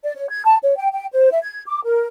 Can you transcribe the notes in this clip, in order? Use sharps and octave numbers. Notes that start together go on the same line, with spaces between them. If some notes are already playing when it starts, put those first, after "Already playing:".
D5
C#5
G#6
A5
C#5
G5
G5
C5
E5
G#6
D6
A#4